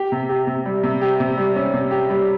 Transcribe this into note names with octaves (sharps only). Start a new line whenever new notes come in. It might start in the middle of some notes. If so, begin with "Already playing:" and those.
Already playing: G4
C3
G4
C3
G3
C3
G4
C3
G3
C#4
C3
G4
G3